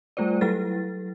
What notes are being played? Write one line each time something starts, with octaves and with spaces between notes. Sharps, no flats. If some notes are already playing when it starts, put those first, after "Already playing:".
G3 A3 F4 C5 D5
F#3 E4 A4 B4 A6